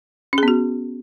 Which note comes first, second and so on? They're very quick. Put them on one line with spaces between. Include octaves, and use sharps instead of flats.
C#4 G#4 B3 F#4